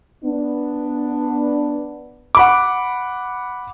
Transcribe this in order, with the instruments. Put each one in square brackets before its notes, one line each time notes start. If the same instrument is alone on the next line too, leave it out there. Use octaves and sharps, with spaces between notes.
[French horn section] B3 D4
[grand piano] F#5 B5 D6